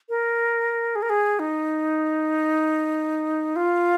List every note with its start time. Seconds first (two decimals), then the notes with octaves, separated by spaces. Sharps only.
0.09 A#4
0.96 G#4
1.02 A#4
1.10 G#4
1.39 D#4
3.56 F4